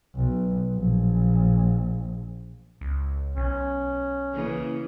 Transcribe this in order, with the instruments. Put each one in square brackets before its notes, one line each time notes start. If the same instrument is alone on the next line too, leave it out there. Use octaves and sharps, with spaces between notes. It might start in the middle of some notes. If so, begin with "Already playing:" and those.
[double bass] B1
A#1
[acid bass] C#2
[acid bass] B1 [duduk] C#4
[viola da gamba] C#3 E3 A#3